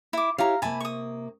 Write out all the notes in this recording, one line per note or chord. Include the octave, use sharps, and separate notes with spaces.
E4 D6
E4 G4 C#5 F5 A#5
C3 A#3 G#5 A5 B5
C#6 D#6